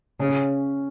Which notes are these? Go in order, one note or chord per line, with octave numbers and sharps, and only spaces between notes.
C#3 C#4